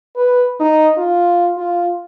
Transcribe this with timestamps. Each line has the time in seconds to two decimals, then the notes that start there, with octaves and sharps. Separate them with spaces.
0.16 B4
0.60 D#4
0.98 F4
1.58 F4